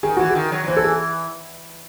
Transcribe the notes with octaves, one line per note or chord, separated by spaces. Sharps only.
D#3 G#4
E3 F#4
G#4
D#3
F#3
F#3
E3 C5
A4
G#4